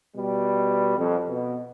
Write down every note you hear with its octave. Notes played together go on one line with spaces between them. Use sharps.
B2 G3
F2
B2